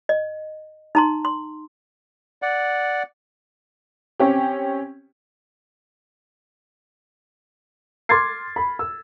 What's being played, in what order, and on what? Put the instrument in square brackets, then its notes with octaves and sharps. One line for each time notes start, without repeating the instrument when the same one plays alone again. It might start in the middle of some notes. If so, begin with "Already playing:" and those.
[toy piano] D#5
D#4 A#5 C6
C6
[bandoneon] D5 F#5
[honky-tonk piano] C4 C#4 G4
[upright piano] C6 D6 F6 G#6 A6 C7
B5
E6